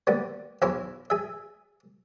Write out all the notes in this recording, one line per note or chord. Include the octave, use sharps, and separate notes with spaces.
D3 G3 A#3 B3
B1 E2 E4 F4 C#5 F5
G#4 E5